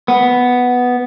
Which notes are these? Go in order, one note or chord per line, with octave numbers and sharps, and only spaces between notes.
B3